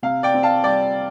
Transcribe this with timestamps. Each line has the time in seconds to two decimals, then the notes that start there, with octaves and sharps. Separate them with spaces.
0.03 C3 F5
0.23 D5 G5
0.34 C4
0.43 F5 A5
0.64 G3 D5 G5